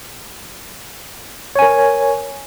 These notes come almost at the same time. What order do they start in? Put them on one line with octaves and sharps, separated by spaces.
C#5 G#5 A#4